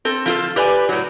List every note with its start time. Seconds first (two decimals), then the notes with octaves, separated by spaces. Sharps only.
0.05 C4 A4
0.26 F3 F4 A4
0.56 G4 B4 D5 G#5
0.89 A2 F#3